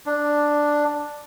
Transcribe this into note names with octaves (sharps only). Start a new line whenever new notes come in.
D4